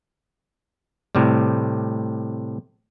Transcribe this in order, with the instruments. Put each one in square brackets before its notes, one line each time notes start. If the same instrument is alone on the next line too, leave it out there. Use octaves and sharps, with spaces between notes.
[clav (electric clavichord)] A2 C3 G3